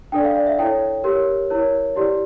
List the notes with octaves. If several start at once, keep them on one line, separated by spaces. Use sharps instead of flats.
D4 A4 D5 G5
F5
D5
E5
E4 A4 C#5 G5
G4 A#4 C#5
E4 A#4 C#5
E4 G4 D5